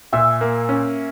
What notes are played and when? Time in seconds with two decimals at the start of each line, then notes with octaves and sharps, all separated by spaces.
0.13 A#2 E5 G#5
0.41 A#3
0.69 C#4